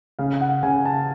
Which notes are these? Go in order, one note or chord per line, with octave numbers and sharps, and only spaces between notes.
C#3 F5
F#5
C#3 G#5
A5